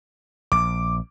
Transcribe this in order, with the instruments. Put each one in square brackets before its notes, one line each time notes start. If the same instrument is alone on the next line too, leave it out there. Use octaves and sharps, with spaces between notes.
[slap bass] A#1 [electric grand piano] D6